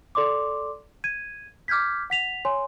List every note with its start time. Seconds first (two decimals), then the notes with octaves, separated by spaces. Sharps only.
0.15 A4 D5 C6 D6
1.04 G#6 D#7
1.68 D6 F6 G6 G#6 B6
2.10 F#5 B6 F7
2.45 C#5 G#5 C6